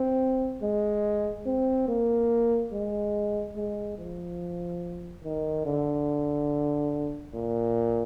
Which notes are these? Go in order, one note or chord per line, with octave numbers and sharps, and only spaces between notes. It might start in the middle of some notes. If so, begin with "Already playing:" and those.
Already playing: C4
G#3
C4
A#3
G#3
G#3
F3
D#3
D3
A#2